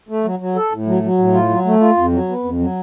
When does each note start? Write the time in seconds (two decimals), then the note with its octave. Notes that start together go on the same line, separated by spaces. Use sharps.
0.09 A3
0.24 F#3
0.39 F#3
0.56 A4
0.72 A2
0.87 F#3
1.03 F#3
1.18 A2
1.33 F4
1.49 F#3
1.65 A3
1.81 F4
1.97 F2
2.12 F#3
2.28 B3
2.44 F2
2.59 F#3